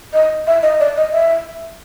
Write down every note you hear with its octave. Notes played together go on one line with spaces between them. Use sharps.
D#5
E5
D#5
D5
D#5
E5